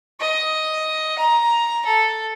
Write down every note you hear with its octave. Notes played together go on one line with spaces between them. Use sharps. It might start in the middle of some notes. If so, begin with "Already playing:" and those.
D#5
A#5
A4